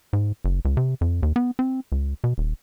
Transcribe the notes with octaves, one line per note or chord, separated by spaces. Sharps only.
G#2
F#1
C#2
C3
F2
D#2
B3
C4
C#2
B2
D#1